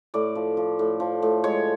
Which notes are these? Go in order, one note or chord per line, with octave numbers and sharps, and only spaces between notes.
A2 D5
F3
F3
A2
F3
A2
G#3 C#5